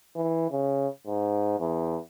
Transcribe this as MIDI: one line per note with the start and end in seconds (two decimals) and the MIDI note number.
0.16 0.49 52
0.51 0.88 49
1.07 1.56 44
1.59 1.98 40